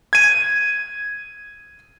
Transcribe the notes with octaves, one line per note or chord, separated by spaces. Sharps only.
G#6 D#7